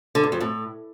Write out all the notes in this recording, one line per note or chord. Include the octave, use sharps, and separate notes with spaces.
D3
G2
F2
A2